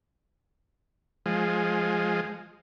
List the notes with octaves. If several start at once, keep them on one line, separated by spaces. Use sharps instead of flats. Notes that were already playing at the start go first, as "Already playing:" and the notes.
F3 G#3